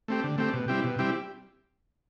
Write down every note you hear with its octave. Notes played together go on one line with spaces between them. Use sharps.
A3 C4 G4
D3
A3 C4 G4
B2
G3 C4 E4 G4
B2
G3 C4 E4 G4